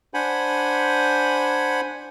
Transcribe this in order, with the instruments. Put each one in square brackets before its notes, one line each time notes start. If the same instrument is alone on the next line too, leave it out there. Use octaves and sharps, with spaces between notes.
[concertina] D4 C5 F#5 G#5 B5